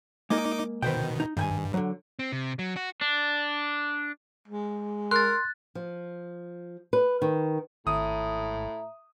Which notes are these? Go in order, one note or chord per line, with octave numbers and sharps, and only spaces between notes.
G#3 A#3 D#4 A#4 D#5 D6
B2 D#3 B4 C5 G5
D#4
G2 D#3 G5 G#5
D3 F#3
C4
C3
F#3
F#4
D4
G#3
A#4 C6 F#6 A6
F3
B4
D#3
G#1 A2 E5 A#5 D#6